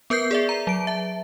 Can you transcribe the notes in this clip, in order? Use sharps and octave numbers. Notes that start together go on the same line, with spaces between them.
B3 A#4 B4 G6 C7
G#4 D5 E5
A#5
F#3 D7
E5 A5